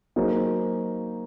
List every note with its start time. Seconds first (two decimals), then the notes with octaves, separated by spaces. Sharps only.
0.16 F#3 A#3 D#4 G#4 C5